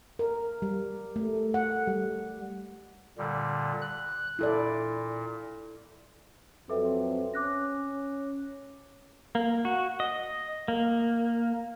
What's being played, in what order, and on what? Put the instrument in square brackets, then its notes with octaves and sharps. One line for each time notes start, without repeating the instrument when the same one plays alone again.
[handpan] A#4
G3
A3
F#5
G3
[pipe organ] A#2 D3 G3
F#6
[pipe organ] A#2 [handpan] E4 A4 D5
[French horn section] F2 F#3 C4 [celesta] A4 B4 E5
[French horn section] C#4 [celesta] D6 F#6 A#6
[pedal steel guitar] A#3
F#4
D#5
A#3